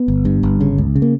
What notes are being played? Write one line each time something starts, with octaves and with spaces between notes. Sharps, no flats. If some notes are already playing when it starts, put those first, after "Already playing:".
Already playing: B3
G1
G2
G1
C#3
C#2
C#3
A#3